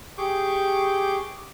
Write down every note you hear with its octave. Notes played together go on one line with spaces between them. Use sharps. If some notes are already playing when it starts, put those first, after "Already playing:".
G4 G#4 C#6 D6 G6